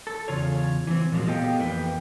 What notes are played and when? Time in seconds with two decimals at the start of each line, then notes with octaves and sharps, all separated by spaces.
0.07 A4
0.28 E2 C#3 F4 C#5
0.87 E3 C4
1.12 A#2 F3 F#3 G#3
1.28 B3 G4 A4 D#5 F5 G5
1.58 F2 E3 A#3 E4 B4 G5